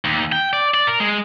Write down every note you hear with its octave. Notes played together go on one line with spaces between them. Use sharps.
D#2
G5
D5
D5
A#4
G#3